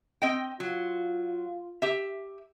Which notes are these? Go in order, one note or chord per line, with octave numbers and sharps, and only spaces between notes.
C4 D#5 G5
F#3 F4
G4 E5